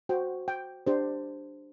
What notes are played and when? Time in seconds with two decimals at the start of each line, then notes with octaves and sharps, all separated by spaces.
0.09 F#4 C5 G5
0.48 G5
0.87 D4 G4 C5